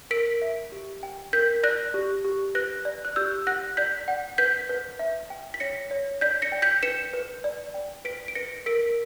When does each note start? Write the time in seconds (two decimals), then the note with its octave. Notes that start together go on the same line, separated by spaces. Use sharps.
0.11 A#4 B6 D7
0.42 E5
0.72 G4
1.03 G5
1.33 A#4 G6 B6
1.63 D5 F#6 A#6
1.94 G4
2.25 G4
2.55 B4 F#6 A#6
2.85 D5
3.05 F#6
3.16 G4 E6 G6
3.47 F#5 F#6 A#6
3.77 D5 G6 B6
4.08 F#5
4.38 B4 G6 B6
4.69 B4
4.99 E5
5.30 G5
5.54 B6
5.60 C#5 A#6 C#7
5.91 C#5
6.21 D5 G6 B6
6.42 A#6 C#7
6.52 G5
6.62 G6 B6
6.83 B4 C#7 E7
7.14 B4
7.44 D5
7.74 G5
8.05 B4 B6 D7
8.28 D7
8.35 B4 A#6 C#7
8.66 A#4 B6 D7